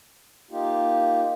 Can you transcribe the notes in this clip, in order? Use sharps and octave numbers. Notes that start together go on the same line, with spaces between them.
A#3 D#4 F4 G4